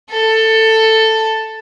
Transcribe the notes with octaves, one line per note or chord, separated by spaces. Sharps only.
A4